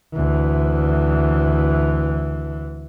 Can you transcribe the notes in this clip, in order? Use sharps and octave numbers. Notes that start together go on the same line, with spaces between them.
D2 E3